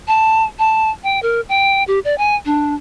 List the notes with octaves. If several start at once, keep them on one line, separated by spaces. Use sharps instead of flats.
A5
A5
G5
A#4
G5
G4
D5
G#5
D4